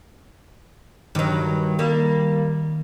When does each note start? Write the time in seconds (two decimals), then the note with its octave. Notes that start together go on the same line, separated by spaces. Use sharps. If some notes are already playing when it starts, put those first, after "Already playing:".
1.15 G2 D#3 F#3
1.79 G3 A#3